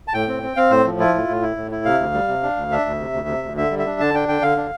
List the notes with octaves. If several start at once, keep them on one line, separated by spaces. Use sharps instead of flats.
A5
A2 G5
C4
C4
C4 F5
A2 C5
F3
E4 F4
A2
A2
E4
A2
E4
C3 F5
D2
G3
C3
D4
D2
D4 E5
D2
C3
D2
C3
D2
D3 E5
G3
E5
D4
D3 A5
D4 G5
D3 G5
D3 F5
D4